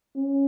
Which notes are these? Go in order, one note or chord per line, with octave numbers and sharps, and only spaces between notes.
C#4